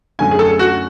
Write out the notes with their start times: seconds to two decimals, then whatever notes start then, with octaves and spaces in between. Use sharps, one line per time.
0.19 F#2 D3 A3 C#4 G#5
0.31 G#4
0.39 A4
0.59 F#4